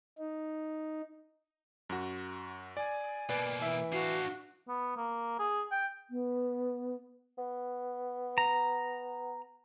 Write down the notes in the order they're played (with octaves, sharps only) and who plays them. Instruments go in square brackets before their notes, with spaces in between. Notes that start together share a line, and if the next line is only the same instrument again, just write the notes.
[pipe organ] D#4
[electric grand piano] F#2 F#4
[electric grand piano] D5 [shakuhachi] G#5
[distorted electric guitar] B2 A#3 [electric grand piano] B4 D5
[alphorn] E3 [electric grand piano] E5
[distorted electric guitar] D4 F5 [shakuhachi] F#4
[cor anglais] B3
A#3
G#4
G5
[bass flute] B3
[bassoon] B3
[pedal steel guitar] A#5